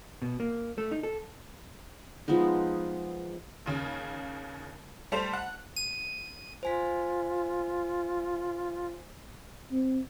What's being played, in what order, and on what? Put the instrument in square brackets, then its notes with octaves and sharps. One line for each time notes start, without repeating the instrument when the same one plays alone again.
[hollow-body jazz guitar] B2
A#3
A3
D#4
A4
[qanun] F3 G#3 B3 D#4
[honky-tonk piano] D#2 C#3
G3 A3 C5 A5 F7
F#5
[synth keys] D#7
[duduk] F4 [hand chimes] C5 G#5 B6
[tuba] C4